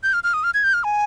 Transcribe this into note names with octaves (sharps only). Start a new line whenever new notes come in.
G6
F6
F6
D#6
F6
G#6
G6
F6
G#5